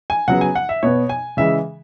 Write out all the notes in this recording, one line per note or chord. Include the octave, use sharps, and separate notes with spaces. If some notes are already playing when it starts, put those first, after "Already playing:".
G#5
C#3 F#3 B3 F#5
G#5
F#5
E5
B2 B3 C#5
G#5
C#3 E3 G#3 E5